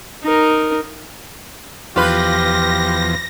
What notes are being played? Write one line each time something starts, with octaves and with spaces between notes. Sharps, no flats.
D#4 A#4
E2 F3 F4 G4 B4 A#6